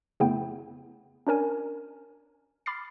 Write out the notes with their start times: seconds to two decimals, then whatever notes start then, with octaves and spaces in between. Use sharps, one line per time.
0.20 F2 C#3 A3 B3 E4 G5
1.27 C#4 D4 A#4 G#5
2.66 B5 D6 F6 A6 C7